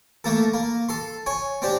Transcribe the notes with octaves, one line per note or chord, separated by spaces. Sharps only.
A3 A#3 A4
A#3
A4 C6
C#5 G#5
C4 D4 G4